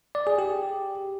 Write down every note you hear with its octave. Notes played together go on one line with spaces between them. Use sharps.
D5
G#4
G4